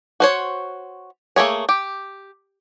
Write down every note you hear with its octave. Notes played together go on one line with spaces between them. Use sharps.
F#4 C5 C#5
A3 A#3 G#4 C#5
G4